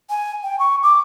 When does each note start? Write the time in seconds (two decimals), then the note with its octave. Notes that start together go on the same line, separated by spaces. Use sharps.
0.10 G#5
0.44 G5
0.59 C#6
0.83 D6